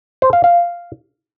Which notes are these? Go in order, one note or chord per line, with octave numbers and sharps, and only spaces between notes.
C5
F5
F5